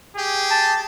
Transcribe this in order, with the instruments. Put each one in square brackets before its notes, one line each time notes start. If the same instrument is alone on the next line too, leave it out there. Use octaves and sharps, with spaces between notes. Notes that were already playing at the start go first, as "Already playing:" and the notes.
[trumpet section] G4 G#4
[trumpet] A5